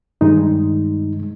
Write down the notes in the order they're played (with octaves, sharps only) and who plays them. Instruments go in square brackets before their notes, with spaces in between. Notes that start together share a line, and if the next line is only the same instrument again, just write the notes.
[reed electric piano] G2 D#3 G#3 D#4